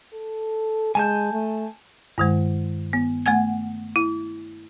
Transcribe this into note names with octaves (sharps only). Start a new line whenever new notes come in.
A4
G#3 G#5 A5 G6
A3
G2 D#3 G#3
B3
A3 F#5 G#5 G#6
E4